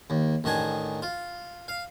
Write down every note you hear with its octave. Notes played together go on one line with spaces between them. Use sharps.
D#2
A1 D#3 D4 G#4
F4
F5